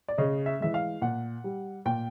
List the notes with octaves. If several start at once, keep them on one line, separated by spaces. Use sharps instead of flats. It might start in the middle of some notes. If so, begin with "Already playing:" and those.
D5
C#3 D#5
E5
E3 G#3 E5
F5
A#2 F#5
G3
A#2 G5